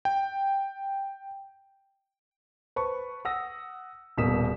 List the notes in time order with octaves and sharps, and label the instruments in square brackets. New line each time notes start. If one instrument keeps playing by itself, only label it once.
[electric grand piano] G5
[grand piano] B4 C5 A5 C#6
F#5 D#6 E6 A#6
D#1 B2 A#3 D#6 B6 E7